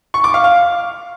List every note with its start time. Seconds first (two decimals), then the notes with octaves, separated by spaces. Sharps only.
0.14 C#6
0.24 D6
0.34 F5
0.44 F5